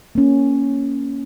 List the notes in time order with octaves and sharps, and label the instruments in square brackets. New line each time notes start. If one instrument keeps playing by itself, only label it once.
[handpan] A#3 C#4